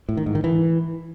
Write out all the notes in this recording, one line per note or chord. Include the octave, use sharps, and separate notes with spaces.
A2
D#3
G#2
D#3
E3